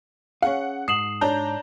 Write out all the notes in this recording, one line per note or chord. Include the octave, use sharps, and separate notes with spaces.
C#4 G#4 F5 F#5
G#2 D#6 C7 E7 F#7
D4 C#5 A5 A#5 G6